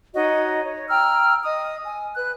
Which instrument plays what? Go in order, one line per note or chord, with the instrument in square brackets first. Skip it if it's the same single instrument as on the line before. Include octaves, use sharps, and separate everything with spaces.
[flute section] D#4 F#4 C#5 D#5
C#5
G5 A#5 E6 F6
D#5 D#6
G#5
B4 F#6